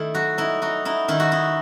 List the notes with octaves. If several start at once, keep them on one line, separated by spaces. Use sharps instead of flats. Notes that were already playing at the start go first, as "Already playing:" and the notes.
Already playing: D#3 A3 E4
F#3 F#4
D#4 E4
D#4 F#4
D#4 E4
D#3 E4
F#4
D#4 E4